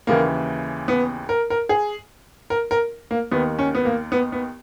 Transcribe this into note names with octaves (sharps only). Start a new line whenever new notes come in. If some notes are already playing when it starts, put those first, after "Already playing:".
D#2 C#3 E3 A#3
B3
A#4
A#4
G#4
A#4
A#4
A#3
D#2 D#3 B3
C#4
B3
A#3
B3
B3